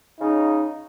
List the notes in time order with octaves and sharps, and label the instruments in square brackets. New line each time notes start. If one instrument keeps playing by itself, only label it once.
[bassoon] C#3 [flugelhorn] D#4